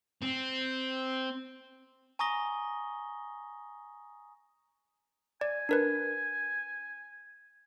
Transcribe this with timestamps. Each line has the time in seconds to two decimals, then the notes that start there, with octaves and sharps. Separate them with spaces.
0.22 C4
2.19 G#5 A#5 C#6 D#6 A#6 G7
5.41 D5 G#5
5.69 D4 A#4 B4